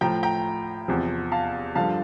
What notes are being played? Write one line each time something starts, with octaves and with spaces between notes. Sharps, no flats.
A2 F3 G5 A#5
G5 A#5
E2 C3 F3
F5 A5
G2 D3 F3 F5 A5